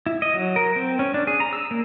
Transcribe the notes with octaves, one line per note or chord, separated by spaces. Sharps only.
E4
D#5
F#3
A#4
C4
C#4
D4
G#4
A#5
E6
A#3